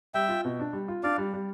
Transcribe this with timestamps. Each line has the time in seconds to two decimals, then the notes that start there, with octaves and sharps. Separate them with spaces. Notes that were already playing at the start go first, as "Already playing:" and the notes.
0.14 G3 E5 G5
0.29 F4
0.45 B2
0.59 D4
0.73 G3
0.88 F4
1.03 D4 D5 F5
1.18 G3
1.33 G3